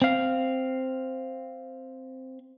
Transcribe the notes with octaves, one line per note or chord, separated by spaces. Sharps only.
C4 F5